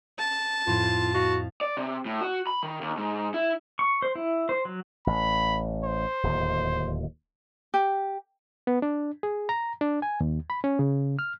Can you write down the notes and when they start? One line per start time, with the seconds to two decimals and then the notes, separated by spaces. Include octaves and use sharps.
0.19 A5
0.67 F2 A2 F4
1.14 F#4 D#5 F5 C#6
1.61 D5
1.77 C3
2.05 A2
2.21 F#4
2.47 B5
2.63 D#3
2.81 D#2
2.97 G#2
3.34 E4
3.79 C#6
4.02 C5
4.15 E4
4.49 C5
4.65 F#3
5.07 A1 B5
5.84 C5
6.23 D1 D#2
7.74 G4
8.67 B3
8.82 D4
9.23 G#4
9.49 A#5
9.81 D4
10.02 G#5
10.20 D#2
10.50 B5
10.64 C#4
10.79 C#3
11.19 F6